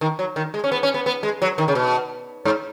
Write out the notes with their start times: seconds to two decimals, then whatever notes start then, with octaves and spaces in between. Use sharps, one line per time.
0.01 D#3
0.19 F#3
0.36 D#3
0.54 G#3
0.64 C#4
0.72 B3
0.83 C#4
0.94 B3
1.06 B3
1.23 G#3
1.42 F#3
1.58 D#3
1.68 C#3
1.75 B2
2.45 G#2